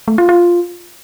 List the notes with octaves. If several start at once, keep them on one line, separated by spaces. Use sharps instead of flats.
A3
F4
F4